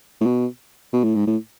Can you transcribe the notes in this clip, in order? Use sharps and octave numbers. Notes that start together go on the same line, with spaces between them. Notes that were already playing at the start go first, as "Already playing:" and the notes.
A2
B2
B2
A2
G#2
A2